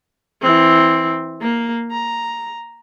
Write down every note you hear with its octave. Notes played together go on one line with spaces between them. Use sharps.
E3 C4
A#3
A#5